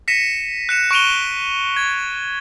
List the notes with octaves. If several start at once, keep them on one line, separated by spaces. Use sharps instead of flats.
A#6 B6 C#7 D#7 E7
F#6 C#7 E7
C#6 F#6 D7 D#7 F7 G7
G#6